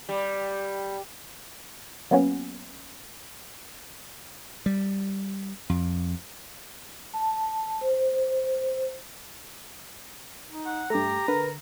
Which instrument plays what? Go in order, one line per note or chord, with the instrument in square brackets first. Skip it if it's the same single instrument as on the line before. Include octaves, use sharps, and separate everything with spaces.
[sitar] G3
[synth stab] F#3 A#3 B3 C#4
[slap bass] G3
F2
[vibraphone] A5
C5
[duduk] D#4
[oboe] F#5
[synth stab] G2 A3 [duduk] G4 [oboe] A#5
[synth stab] D3 [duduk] A#4 [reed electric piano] B4